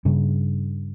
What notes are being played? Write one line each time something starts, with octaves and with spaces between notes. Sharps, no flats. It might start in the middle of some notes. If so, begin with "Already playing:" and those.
G2 C#3